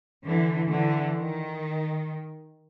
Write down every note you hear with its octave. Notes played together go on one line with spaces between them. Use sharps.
D3 E3
D3 E3
D#3